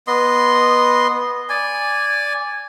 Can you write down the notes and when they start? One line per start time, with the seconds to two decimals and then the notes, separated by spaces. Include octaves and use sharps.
0.07 B3 D#5 C6
1.49 D5 G#5